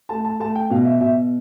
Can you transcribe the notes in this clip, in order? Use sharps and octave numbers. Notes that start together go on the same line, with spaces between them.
A3 A5
A5
A3 A5
G5
B2 F5
E5
B2 E5